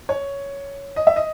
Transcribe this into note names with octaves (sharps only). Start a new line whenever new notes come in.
C#5
D#5
E5
D#5